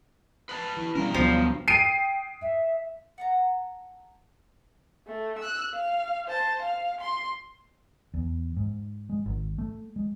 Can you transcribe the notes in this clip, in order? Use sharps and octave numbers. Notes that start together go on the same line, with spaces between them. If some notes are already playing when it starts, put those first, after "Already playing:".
B4 A5
E3
G2 B2 G3 C#4 A#4 F5
D2 F3 F#3 B3 D4
G5 C7 D7 D#7
E5
F#5 A5 A#5
A3
E6 F#6
F5
C5 A5
F5
C6
E2
G#2
G#3
G#1
A3
G#3